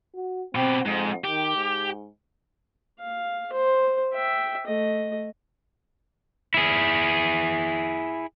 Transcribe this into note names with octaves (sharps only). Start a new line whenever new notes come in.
F#4
B2 C4 G4
F2 G#2
D#3 G4
G#2
F5
C5
E5 G5
A3 D#5
E4 G#4